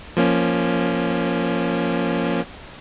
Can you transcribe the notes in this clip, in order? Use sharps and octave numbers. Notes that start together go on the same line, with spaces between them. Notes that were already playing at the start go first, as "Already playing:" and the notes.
F3 A#3 C#4